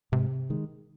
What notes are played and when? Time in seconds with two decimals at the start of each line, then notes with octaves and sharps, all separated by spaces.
0.12 G#2 C3
0.50 D#3 G#3